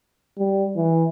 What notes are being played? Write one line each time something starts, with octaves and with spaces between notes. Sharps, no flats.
G3
E3